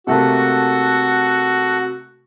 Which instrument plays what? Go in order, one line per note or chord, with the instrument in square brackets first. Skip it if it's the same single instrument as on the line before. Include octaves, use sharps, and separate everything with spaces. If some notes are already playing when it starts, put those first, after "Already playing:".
[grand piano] C3 A3 A#3 [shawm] F#4 [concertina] A4 F#5